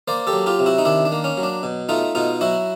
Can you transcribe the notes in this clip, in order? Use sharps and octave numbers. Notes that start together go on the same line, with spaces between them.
A#3 C5 D5
G4 A4
F#3
F4 G4
C3
E4 F#4
D#4
D#3 D4 E4
D4
A#3
C#4
F#3
D4
B2
A3 D#4 F4
B2 D#4 F4
F#3 E4 F#4